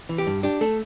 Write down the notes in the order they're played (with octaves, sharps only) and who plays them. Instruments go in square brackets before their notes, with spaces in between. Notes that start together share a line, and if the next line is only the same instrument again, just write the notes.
[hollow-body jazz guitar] E3
G4
G2
D4 G4
A3 A4